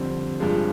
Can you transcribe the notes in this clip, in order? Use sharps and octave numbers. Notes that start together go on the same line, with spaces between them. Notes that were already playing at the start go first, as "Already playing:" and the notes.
Already playing: F2 D3 G3 C4
G2 F3 G#3